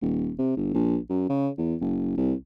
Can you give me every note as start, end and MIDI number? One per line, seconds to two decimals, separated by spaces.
0.02 0.32 27
0.38 0.56 48
0.57 0.71 31
0.74 0.97 34
1.10 1.25 42
1.29 1.49 49
1.58 1.75 40
1.81 2.16 30
2.18 2.34 36